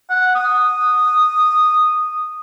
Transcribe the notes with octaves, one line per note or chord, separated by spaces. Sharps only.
F#5
D#6